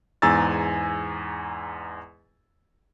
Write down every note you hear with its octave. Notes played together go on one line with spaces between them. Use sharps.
E2 G#2 G#5 A#5 E6 A6